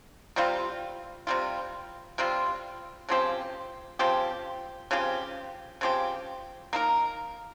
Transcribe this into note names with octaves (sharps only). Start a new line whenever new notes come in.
C3 G3 C4 F4
C3 G3 C4 F4
C3 G3 C4 F4
C#3 F3 C4 G4
C#3 F3 C4 G4
C#3 F3 C4 G4
C#3 F3 C4 G4
A#3 D#4 A#4